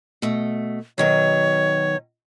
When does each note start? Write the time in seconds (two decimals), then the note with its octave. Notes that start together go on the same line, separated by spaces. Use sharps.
0.22 B2 A3
0.98 B2 D#3 F#3 C#5